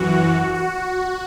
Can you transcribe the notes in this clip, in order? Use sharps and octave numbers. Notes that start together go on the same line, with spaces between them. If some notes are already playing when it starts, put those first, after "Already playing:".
Already playing: F#2 E3 F#4
F#4